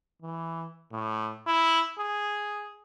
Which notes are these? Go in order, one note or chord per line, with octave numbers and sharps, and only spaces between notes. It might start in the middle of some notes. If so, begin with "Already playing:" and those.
E3
A2
E4
G#4